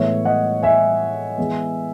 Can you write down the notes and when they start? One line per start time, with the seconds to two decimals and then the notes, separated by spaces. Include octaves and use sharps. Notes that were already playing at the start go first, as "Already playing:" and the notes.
Already playing: A2 E3 G#3 B3 C#5 E5
0.25 D#5 F#5
0.63 E5 G#5
1.38 E3 G#3 B3